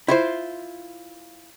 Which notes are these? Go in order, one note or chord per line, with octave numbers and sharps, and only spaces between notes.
E4 F4 C5